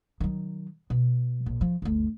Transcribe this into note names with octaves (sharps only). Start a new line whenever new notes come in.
D#3 F#3
B2
A#1
F3
G1 D2